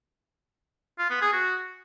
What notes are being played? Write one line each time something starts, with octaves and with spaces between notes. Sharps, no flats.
F4
B3
G#4
F#4